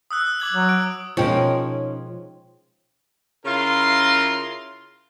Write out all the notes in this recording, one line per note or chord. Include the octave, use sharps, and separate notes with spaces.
D#6 E6 F#6
D6 G#6 F#7
F#3
D7
B2 F3 G#3 C#4 D#4 A#4 G5 C#6
C#3 E4 F4 A#4 C6